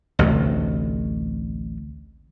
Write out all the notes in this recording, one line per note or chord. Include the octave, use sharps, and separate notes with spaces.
A1 D2 C3 A3